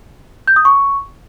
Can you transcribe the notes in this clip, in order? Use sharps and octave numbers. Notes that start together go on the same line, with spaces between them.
G6
D#6
C#6